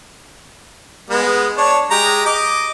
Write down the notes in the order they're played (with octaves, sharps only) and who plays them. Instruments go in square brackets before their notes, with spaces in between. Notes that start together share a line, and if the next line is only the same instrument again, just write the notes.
[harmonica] G#3 B3
D4 C#5 A5
G#3 G4 A#5
D#5 D6